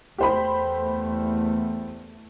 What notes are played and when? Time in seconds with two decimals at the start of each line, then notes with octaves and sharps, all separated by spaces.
0.18 E2 A3 G4 C5 B5